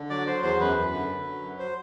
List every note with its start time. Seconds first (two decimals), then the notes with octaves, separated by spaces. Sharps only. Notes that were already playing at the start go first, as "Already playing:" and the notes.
Already playing: D3
0.10 F#3 D5
0.27 F#3 C5
0.43 E2 C5
0.60 F#2 B4
0.76 F#2
0.93 D3
1.09 D3
1.26 F#3
1.42 F#2
1.59 C5